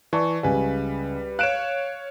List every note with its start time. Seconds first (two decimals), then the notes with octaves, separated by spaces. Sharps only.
0.13 E3 D5 A5 C#6
0.43 C#2 G3 B4 G#5
1.39 C#5 F5 F#6 D7 E7